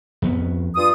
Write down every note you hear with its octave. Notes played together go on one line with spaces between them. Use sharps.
F2 B3
G2 F4 D#6